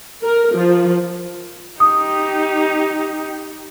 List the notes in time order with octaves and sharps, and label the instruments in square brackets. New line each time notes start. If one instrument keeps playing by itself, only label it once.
[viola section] A#4
F3
[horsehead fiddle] D#4 G4 [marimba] D#6